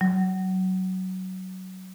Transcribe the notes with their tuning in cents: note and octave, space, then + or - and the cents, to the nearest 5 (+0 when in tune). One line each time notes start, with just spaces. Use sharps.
F#3 +15